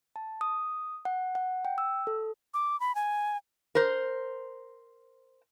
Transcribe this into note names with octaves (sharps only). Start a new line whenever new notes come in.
A5
D#6
F#5
F#5
G5
E6
A4
D6
B5
G#5
A#4 C5